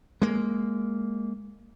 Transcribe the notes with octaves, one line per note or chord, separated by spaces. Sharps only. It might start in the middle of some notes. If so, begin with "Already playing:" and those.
G#3 A#3